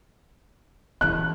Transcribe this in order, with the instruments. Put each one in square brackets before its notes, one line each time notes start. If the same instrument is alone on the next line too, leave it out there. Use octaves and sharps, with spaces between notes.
[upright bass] E3 C#4 [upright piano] F#6